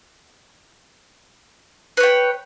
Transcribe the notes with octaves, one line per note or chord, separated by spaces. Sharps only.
B4 C#5 G5